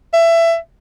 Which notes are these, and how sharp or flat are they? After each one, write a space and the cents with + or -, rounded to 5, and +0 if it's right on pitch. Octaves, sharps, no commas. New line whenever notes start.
E5 +20